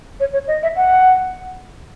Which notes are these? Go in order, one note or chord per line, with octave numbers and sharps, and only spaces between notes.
C#5
C#5
D#5
E5
F#5